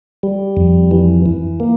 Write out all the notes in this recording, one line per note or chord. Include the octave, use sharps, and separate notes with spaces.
G3
F2
E3
E3
A#3